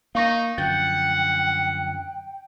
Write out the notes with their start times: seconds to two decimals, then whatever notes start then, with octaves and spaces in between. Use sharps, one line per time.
0.15 A#3 D#4 F5 C#6 A#6
0.58 F#2 D3 F3 F#5 G5 G6 A6